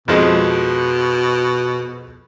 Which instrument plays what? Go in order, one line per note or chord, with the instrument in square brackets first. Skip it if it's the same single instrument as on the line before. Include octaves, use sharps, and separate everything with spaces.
[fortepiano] F2 F3 G#3 [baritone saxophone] B2